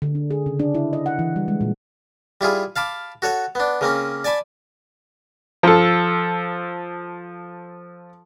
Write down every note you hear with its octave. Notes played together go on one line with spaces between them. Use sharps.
D3
D4
G#4
C#3
D4
E4
D#5
F#5
E3
G3
G#3
A#2
G3 E4 F4 G#4
F5 A5 B5 D6
F#4 A4 C#5 F#5
B3 D4
C#3 A#3 C4 C#4
D5 G#5 A5 B5
F3 A4